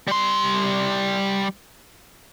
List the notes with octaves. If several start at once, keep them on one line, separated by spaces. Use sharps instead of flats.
G3 C6